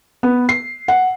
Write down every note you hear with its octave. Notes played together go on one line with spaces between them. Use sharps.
B3
C7
F#5